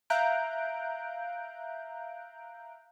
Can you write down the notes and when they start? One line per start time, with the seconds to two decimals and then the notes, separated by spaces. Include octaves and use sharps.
0.10 E5 F5 A#5 F#6 G6 D7